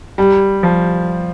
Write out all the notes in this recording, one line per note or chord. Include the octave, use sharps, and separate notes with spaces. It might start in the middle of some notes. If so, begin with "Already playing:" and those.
G3
F3